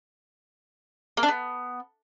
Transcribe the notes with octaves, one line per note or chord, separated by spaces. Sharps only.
A#3
D4
B3